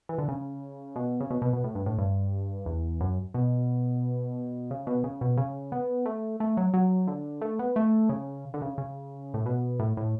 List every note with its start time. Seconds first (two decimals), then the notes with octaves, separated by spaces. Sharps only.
0.09 E3
0.18 D3
0.28 C#3
0.96 B2
1.20 C#3
1.30 B2
1.42 B2
1.53 B2
1.64 A2
1.75 G2
1.86 A2
1.98 G2
2.66 E2
3.01 F#2
3.34 B2
4.71 C#3
4.87 B2
5.04 C#3
5.21 B2
5.37 C#3
5.72 B3
6.06 A3
6.40 A3
6.57 F#3
6.74 F#3
7.08 D3
7.41 A3
7.59 B3
7.76 A3
8.09 C#3
8.54 D3
8.61 C#3
8.78 C#3
9.34 A2
9.46 B2
9.79 A2
9.97 A2